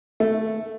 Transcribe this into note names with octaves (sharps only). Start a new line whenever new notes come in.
A3